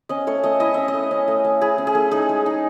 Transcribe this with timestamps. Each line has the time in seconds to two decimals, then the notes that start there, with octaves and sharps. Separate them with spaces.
0.09 C#4 D#5
0.27 A3 C#5
0.44 A3 D#5
0.60 E4 D#5
0.74 C#4 E5
0.88 D#5
0.94 A3
1.11 C#4
1.28 A3
1.44 A3
1.61 E4 G#4
1.78 C#4
1.87 G#4
1.95 A3
2.11 D#4 G#4
2.29 G#3
2.46 D#4